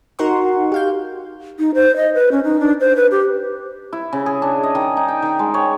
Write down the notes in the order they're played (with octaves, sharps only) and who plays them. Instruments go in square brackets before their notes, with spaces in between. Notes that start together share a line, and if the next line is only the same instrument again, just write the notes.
[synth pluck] D#4 F#4 A#4 F#5 C6 C#6
G4 F5 G6
[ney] D#4
C5
D#5
B4
C#4
D#4
D4
C5
B4
G4
[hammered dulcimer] E4
C#3
G#4
D4
D#5
D#3
D#4
G5
D#3
G#3
C#5